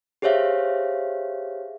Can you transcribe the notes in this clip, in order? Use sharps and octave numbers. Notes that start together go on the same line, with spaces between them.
G4 G#4 C5 C#5 E5 F5